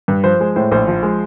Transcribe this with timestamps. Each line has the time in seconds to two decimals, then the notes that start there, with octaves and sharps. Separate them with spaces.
0.08 G2
0.24 F3 C5
0.40 G#3
0.56 A2 C5
0.72 A#1 C5
0.88 F3
1.03 G#3